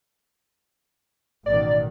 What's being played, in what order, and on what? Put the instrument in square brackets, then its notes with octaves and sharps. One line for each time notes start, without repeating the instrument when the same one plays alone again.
[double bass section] A1 B2 D#3 [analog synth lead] D5